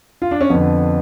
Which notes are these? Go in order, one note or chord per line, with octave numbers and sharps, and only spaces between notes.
F4
D4
C#4
F2 D3 B3